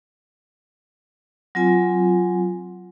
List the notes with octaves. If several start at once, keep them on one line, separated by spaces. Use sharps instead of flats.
F#3 C4 F4 G#5